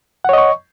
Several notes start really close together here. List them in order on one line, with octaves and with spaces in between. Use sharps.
F#5 C#5 D#5 C#6